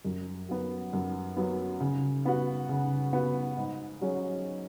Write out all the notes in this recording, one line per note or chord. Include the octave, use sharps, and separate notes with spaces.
F#2
F#3 B3
F#2
F#3 B3
C#3
B3 F#4
C#3
B3 F#4
G#2
F#3 C#4 G#4